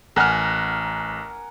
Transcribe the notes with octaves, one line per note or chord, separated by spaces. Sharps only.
A1 A#4 F#5 G#5 F6